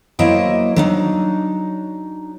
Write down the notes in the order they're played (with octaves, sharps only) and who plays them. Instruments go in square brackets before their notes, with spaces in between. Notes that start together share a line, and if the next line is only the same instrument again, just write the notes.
[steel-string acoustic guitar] F#3 A#3 E4 C5 D#5 G5
F#3 D4 D#4